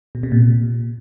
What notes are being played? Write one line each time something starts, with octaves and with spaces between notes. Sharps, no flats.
B2
C3
A#2